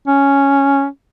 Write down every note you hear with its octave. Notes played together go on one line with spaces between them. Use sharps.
C#4